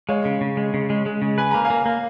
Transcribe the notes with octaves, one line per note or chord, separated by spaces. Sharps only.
G#3 C#5 F5
C#3
C#3
G#3
C#3
G#3
G#3
C#3
B4 G#5
A#3 A#5
F5 G#5
A#3
A#3